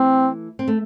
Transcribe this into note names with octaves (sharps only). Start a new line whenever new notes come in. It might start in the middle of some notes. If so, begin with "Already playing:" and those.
Already playing: E3 A3 C4
C4
A3